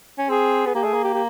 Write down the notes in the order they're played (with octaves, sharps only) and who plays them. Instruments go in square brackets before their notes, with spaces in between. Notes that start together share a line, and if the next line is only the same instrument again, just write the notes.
[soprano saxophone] C#4
[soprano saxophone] C4 [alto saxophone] G#4
[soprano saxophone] B3 [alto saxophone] G#4
[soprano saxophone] A#3 [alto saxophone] G4
[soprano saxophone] A3 [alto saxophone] G#4
[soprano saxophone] A#3
[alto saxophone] G4
G4